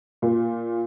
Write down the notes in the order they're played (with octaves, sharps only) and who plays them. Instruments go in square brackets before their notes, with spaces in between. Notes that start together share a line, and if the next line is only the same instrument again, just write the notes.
[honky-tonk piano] A#2